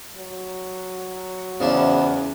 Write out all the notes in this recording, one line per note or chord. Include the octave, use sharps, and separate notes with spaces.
F#3
E2 C#3 F3 D4 E4